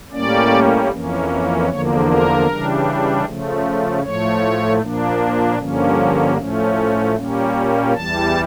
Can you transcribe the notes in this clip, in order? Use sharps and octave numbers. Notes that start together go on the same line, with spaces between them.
A2 G3 A#3 C#4 D5
F2 E3 A#3 C#4
E2 D3 F3 A#3 C#5
A#4
C#3 E3 G3 D4
C#3 F3 A3
A2 F3 A3 C#5
A#2 F3 A#3 D4
G2 D3 F3 A#3 C#4
A2 F3 A3 C#4
A#2 G3 A#3 C#4
E2 E3 G3 A5